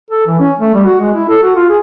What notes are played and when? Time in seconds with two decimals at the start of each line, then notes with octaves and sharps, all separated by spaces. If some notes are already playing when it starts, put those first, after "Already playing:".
0.11 A4
0.27 E3
0.40 C#4
0.60 A3
0.74 G3
0.85 F#4
1.00 G#3
1.14 E4
1.29 A4
1.43 F#4
1.56 F4
1.69 G#4